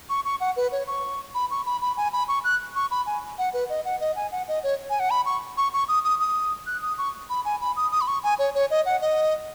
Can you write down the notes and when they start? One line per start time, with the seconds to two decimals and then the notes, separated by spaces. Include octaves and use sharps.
0.10 C#6
0.25 C#6
0.40 F#5
0.57 B4
0.72 C#5
0.87 C#6
1.35 B5
1.51 C#6
1.66 B5
1.82 B5
1.97 G#5
2.13 B5
2.28 C#6
2.44 F#6
2.75 C#6
2.91 B5
3.06 G#5
3.38 F#5
3.54 B4
3.70 D#5
3.85 F#5
4.01 D#5
4.16 G#5
4.32 F#5
4.48 D#5
4.63 C#5
4.90 G#5
5.00 F#5
5.10 B5
5.26 C#6
5.57 C#6
5.73 C#6
5.88 D#6
6.04 D#6
6.20 D#6
6.67 F#6
6.82 D#6
6.98 C#6
7.30 B5
7.45 G#5
7.61 B5
7.76 D#6
7.91 D#6
8.01 B5
8.08 C#6
8.23 G#5
8.39 C#5
8.55 C#5
8.70 D#5
8.86 F#5
9.01 D#5